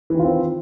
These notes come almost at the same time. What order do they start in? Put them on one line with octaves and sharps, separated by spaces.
E3 D#3 F4 C4